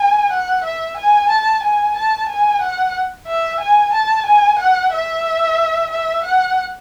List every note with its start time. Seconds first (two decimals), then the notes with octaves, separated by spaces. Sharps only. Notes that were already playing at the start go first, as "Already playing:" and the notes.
Already playing: G#5
0.31 F#5
0.63 E5
0.97 G#5
1.29 A5
1.63 G#5
1.96 A5
2.28 G#5
2.61 F#5
3.27 E5
3.60 G#5
3.93 A5
4.26 G#5
4.59 F#5
4.92 E5
5.90 E5
6.23 F#5